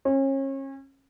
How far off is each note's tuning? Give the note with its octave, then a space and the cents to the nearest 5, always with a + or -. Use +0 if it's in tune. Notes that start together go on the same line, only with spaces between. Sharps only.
C#4 -35